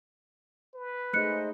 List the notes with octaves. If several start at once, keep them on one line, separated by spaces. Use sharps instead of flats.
B4
A3 D#4 G#4 C5 D#5 F#6 C#7